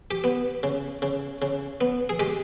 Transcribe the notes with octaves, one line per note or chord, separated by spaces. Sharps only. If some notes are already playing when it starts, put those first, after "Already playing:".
G4
B3
C#3
C#3
C#3
B3
G#4
G#3 G4